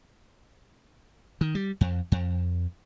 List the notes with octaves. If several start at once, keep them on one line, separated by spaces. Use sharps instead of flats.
D#3
G3
F2
F2